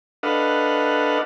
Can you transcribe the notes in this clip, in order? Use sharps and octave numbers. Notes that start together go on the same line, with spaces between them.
D4 A4 B4 D#5 F5 F#5